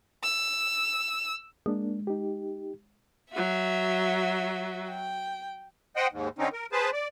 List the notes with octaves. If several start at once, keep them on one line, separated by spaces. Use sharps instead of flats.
E6
G#3 A#3 D4
D#4 G4
F#3 F#4 E5
G5
C5 D#5 F#5 G5
D#2 G#2
D3 C4 C#4 D#4
A#4
G#4 B4 C5 A5
D5